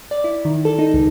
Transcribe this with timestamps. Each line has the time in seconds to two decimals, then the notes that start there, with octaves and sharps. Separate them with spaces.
0.11 D5
0.24 E4
0.45 D#3
0.65 A4
0.79 D#4
0.94 C#2